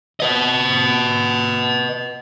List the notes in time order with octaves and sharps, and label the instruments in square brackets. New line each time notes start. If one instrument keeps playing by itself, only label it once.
[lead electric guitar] B4 D#5